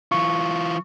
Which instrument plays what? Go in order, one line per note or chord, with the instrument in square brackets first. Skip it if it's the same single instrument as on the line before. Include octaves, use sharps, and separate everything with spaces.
[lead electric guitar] E3 F4 [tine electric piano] C#6